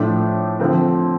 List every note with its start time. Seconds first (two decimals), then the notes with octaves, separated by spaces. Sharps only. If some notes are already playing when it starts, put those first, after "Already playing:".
Already playing: A2 F3 A3 D4
0.60 D3 F3 C4